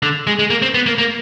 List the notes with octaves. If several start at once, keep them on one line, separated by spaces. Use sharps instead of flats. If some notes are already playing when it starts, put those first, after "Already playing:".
D3
G#3
G#3
A#3
C4
B3
A#3
A#3